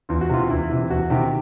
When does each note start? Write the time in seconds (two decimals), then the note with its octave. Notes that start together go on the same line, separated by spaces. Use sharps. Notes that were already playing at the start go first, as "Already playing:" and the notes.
0.09 E2 F4
0.21 F#4
0.30 C3 E3 F4
0.50 E2 E4
0.70 C3 E3
0.90 E2 F#4
1.10 C3 D#3 G4